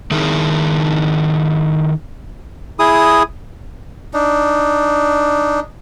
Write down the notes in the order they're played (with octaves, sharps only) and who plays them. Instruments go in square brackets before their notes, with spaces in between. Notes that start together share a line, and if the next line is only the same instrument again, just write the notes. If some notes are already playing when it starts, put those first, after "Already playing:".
[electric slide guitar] D#3 D#4 E4 G#4 A#4
[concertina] E4 G#4 D#6
[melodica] D4 D#4